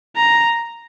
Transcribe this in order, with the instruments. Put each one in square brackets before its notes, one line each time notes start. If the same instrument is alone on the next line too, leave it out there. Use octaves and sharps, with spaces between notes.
[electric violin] A#5